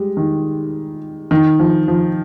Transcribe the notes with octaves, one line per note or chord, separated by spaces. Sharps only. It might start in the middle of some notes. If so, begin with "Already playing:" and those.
Already playing: G3 G#3
D#3
D#3
F3
F3